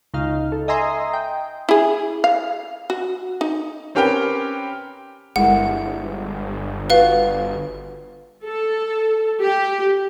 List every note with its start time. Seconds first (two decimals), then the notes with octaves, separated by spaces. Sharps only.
0.14 C#2 D#4 F5
0.52 A4
0.68 D#5 E5 G#5 A#5 C6 D#6
1.13 G5
1.69 E4 G#4
2.24 F5
2.90 F#4
3.41 D#4
3.95 C4 C#4 G4 A#4 B4 G5
5.36 G1 G#3 E4 A#4 F#5
6.90 F4 F#4 B4 F5
8.44 A4
9.41 G4